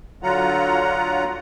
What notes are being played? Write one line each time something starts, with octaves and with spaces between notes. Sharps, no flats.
D3 F#3 F4 F#5 A#5